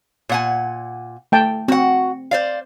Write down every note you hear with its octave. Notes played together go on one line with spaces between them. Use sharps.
A#2 F#5 G#5
A3 G5 A5
C4 F#4 F#5
C5 D5 F5